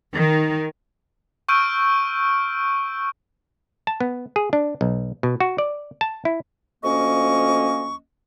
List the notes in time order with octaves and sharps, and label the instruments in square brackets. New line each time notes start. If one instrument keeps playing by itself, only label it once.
[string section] D#3
[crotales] C#6 E6 F6 G6 D7 D#7
[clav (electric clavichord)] A5
B3
G#4
D4
B1
B2
F#4
D5
A5
E4
[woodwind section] D2 F3 A#3 C#4 D#5 C#6